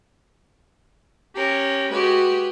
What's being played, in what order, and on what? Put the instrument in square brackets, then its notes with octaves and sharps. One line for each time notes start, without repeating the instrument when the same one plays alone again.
[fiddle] C#4 A#4 [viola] G4
[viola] G#3 F#4 [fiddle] G4 B4